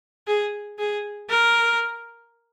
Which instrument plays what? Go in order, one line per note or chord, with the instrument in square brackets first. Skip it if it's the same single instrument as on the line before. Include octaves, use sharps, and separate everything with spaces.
[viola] G#4
G#4
A#4